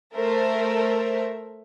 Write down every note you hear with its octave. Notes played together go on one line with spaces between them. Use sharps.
A3 A#4 C5 E5